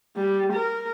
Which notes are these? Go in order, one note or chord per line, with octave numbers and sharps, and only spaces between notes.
G3
A#4